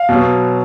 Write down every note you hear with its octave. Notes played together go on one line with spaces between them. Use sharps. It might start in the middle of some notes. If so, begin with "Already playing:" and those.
Already playing: F5
B2 F#3